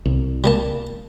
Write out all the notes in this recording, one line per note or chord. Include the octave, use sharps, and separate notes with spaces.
C2
G3 A#3 A5